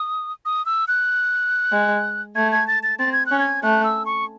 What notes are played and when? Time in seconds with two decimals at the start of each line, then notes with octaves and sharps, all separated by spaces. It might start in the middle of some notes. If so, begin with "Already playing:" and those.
Already playing: D#6
0.45 D#6
0.66 E6
0.88 F#6
1.72 G#3
2.35 A3 G#6
2.52 G#6
2.68 A6
2.83 A6
2.99 C4 A6
3.12 G#6
3.26 C#4 F#6
3.40 G#6
3.63 A3 F#6
3.84 E6
4.06 C#6